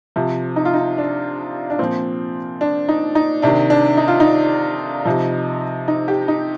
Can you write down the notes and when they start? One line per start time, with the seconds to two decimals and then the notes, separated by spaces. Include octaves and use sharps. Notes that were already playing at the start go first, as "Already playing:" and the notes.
0.16 C3 F3
0.56 D#4
0.65 F4
0.73 D#4
0.98 D4
1.70 D4
1.79 A#2 F3 C4
2.61 D4
2.89 D#4
3.15 D#4
3.42 C3 D#3 D4
3.70 D4
3.97 D#4
4.08 F4
4.20 D#4
5.05 C3 F3
5.88 D#4
6.08 G4
6.28 D#4